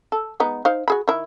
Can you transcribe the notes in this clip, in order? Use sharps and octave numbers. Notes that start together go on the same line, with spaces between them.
A4
G#3 B3 D#4
D#4 C5 F5
F#4 G#4 B5
D#3 E4